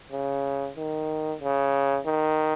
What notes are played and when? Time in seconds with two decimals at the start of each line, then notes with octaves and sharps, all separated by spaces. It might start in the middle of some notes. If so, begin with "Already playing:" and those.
0.12 C#3
0.77 D#3
1.41 C#3
2.06 D#3